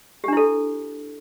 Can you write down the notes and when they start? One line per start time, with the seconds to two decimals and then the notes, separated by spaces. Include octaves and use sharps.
0.24 G4
0.28 D4
0.33 E4
0.37 A4